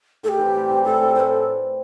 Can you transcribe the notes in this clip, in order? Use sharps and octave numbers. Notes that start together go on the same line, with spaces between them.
A2 A4
G4
E3 G3 C4
A2
E3 G3 C4
A2 A4
E3 C4 G4
A2 A4 C5